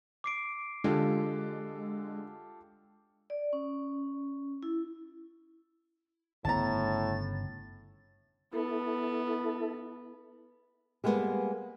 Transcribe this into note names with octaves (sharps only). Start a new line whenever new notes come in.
D6 C7 D7
D3 G#3 F4 G4 A4
D5
C#4
E4
G1 A2 C#3 B3 A5 A#5 A6
B3 E4 A4
G3 G#3 A#3 B3